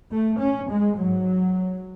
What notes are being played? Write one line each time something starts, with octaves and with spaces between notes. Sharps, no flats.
A3
C#4
G#3
G#2 F#3